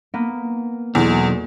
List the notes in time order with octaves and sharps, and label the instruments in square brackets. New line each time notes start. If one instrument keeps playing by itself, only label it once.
[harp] A#3 B3
[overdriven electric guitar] B1 [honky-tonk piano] E2